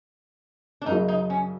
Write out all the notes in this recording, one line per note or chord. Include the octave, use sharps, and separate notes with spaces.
D4
F#2 C#3 F#3 D#4
D#4
C#4